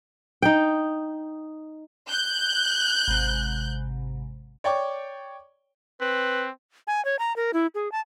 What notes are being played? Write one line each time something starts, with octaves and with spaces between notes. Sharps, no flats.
D#4 G5
F#6 G6
G#1 C3
C#5 D5 G5 C#6 D6
C4 B4
G#5
C#5
A#5
A#4
E4
G#4
A5